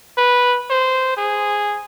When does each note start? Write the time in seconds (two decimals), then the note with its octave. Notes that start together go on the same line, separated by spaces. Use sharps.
0.18 B4
0.70 C5
1.17 G#4